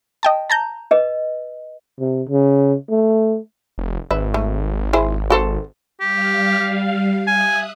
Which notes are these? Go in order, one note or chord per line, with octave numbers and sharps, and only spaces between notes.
D#5 G5 A5
A5 A#5 G6
B4 D#5
C3
C#3
A3
F1
G#1 B4 E5
A3
E4 G#4 C5
F#4 A4 C5
G3 G4 F5
E5 G#5 D#6 F#6